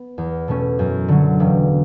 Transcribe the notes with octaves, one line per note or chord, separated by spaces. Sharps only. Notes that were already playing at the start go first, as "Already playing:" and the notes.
Already playing: B3
E2
B2 A3 C#4
F#2
D3 F#3
E1